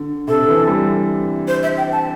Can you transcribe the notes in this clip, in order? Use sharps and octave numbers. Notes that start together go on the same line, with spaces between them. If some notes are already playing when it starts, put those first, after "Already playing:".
Already playing: D3
C3 A4
E3
G3
C5
E5
G5
A5